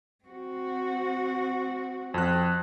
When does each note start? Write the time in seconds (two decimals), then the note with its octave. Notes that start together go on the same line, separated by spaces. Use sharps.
0.24 C4 F#4
2.14 F2 F#6